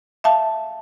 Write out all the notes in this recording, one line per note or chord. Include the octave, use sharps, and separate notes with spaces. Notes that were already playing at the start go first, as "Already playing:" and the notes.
E5 F5 A5